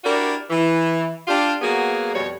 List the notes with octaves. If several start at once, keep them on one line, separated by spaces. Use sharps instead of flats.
D4 E4 F#4 G4 A#4 D5
E3
D4 F4 G4
F#3 A#3 B3 F#4 G#4
F2 B2 G3 C#5